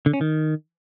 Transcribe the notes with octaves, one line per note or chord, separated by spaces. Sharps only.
D3
C#4
D#3